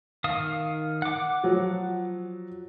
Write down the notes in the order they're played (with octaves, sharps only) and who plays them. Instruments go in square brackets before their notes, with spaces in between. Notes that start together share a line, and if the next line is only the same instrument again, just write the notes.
[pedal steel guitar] D#3 F5 D#6
F#5 D6
[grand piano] F3 F#3